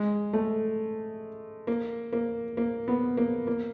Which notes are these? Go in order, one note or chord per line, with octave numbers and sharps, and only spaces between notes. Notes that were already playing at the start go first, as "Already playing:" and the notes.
Already playing: G#3
A3
A#3
A#3
A#3
B3
A#3
A#3